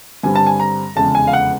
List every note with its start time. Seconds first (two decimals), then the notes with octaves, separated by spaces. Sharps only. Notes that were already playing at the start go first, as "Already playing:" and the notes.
0.23 G2 D3 G3 C4 G#5
0.35 A5
0.47 G#5
0.60 A#5
0.96 F1 E2 C#3 E3 G#3 A5
1.15 G#5
1.27 F5
1.33 F#5